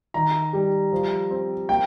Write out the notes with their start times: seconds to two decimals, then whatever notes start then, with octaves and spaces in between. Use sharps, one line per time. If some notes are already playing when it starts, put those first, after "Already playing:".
0.14 D#3 A#5
0.53 G3
0.92 F3
1.30 C4
1.69 A#3 G5